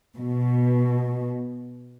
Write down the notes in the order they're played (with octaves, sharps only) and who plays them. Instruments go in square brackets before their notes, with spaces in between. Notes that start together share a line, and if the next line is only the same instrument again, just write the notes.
[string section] B2